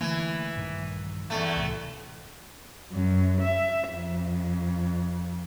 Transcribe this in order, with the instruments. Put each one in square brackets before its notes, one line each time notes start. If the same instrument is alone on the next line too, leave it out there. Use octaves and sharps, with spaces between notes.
[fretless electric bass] D3 A3 A#3 [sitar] E3
[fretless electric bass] A#1 G2 D#3
[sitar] E2 A#2 A3
[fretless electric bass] C2 A2
[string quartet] F#2
E5
F2